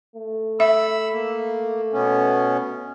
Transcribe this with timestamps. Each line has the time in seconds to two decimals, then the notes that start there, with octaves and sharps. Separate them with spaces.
0.16 A3
0.60 E5 B5 E6
1.12 A#3
1.93 B2 B3 C#4